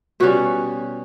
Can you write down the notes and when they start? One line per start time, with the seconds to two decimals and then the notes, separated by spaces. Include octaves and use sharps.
0.20 B2 G3 C#4 F#4